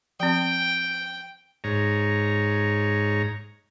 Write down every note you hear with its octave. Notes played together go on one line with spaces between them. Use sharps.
F3 C4 G5
G#2 C#5 A#5